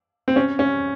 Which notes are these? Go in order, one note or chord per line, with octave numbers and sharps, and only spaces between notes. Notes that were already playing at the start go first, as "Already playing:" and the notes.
C4
C#4
C#4